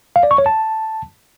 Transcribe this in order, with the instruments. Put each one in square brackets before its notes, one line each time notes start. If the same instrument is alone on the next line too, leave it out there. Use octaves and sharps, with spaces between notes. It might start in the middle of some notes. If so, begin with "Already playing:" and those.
[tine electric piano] F5
D5
C#6
C#5
A5